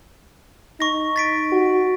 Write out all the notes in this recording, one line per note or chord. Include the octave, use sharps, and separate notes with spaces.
D#4 C#6 A#6
A6 B6 D7
F#4